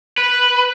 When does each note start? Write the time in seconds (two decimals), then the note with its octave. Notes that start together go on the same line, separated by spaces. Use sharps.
0.18 B4